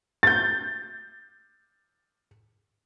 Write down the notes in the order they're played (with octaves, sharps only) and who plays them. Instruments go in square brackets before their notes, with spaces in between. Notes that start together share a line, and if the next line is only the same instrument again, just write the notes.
[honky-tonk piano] G6 A6